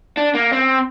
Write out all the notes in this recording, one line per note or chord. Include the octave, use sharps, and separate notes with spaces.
D4
A#3
C4